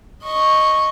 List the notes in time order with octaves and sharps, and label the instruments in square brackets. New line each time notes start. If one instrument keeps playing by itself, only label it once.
[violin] D#5 C#6